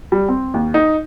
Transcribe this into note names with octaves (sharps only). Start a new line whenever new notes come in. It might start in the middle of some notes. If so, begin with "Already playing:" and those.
G3
C4
D#2
D#4